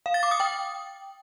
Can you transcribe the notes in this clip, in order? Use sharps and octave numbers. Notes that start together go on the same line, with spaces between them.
F5
A6
D6
D#6
G5